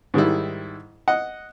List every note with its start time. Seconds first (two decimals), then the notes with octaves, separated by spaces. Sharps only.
0.14 G#2 D#3 G3 E4
1.08 D#5 F#5